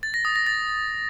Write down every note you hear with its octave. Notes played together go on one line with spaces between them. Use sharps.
A6
A#6
D#6
A#6
A6